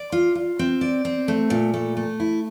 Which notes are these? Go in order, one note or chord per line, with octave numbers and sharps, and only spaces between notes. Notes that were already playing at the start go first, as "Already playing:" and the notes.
Already playing: D5
F4
F4
C4
D5
C4
A3
A#2
A3
A3
E4